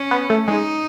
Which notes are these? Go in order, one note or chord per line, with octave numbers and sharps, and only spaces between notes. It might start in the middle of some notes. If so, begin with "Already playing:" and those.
Already playing: C#4
B3
A3
G#3 D#4